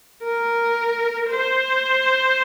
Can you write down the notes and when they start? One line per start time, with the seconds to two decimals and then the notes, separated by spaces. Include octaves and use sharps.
0.23 A#4
1.30 C5